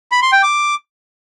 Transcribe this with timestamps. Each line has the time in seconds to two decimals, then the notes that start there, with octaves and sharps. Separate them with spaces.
0.12 B5
0.22 C6
0.32 G5
0.43 D6